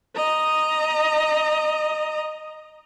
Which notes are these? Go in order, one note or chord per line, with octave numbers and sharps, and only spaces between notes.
D#5 A#5